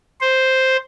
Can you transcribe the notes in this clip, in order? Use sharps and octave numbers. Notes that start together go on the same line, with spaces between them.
C5